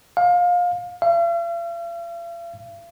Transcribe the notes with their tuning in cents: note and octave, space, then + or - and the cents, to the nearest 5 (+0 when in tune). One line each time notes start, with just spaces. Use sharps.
F5 +25
F5 -45